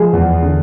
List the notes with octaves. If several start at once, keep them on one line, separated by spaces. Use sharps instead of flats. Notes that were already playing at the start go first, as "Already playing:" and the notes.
Already playing: F3 G#3 G#4
E2
D3